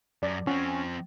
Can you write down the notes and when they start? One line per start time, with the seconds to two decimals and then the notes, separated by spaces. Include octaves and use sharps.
0.23 F#2 D5
0.47 F3 C4 C#4 F#5